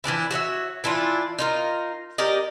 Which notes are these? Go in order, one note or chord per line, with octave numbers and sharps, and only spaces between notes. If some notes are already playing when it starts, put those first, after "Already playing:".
E3 F3 D4 E4
F#4 C#5 D#5 E5
E3 D4 E4 F4
D#4 F4 A#4
G4 A#4 D5 D#5